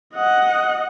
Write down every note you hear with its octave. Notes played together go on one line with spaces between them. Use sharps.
D#5 F#5